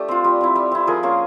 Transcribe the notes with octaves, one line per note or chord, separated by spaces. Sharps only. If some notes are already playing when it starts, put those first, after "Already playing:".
Already playing: A3 D4 G4
C4 F4
G3
C4 E4
G3
C4 E4
F3 G#4 A#4
A#3 C#4 F4